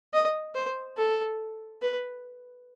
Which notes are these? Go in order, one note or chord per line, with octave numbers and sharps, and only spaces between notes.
D#5
C5
A4
B4